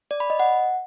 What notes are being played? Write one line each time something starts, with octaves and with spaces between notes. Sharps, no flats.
D5
B5
D#5
F#5